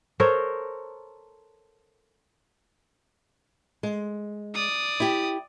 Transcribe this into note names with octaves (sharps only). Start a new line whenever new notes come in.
A4 A#4 C5 C#5
G#3
D5 D#6
E4 G4